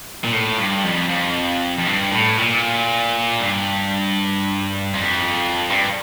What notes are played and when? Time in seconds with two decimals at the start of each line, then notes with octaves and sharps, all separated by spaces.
0.24 A#2
0.33 A2
0.58 G2
0.84 F2
1.10 F2
1.78 F2
1.86 G2
2.11 A2
2.38 A#2
3.40 G2
4.93 F2
5.70 G2